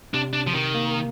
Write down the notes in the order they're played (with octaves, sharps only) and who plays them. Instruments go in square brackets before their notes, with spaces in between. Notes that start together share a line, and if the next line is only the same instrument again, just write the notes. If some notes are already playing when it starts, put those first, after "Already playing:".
[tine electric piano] C3 [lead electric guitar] D4
[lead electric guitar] D4
F3
D#3
[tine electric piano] A#3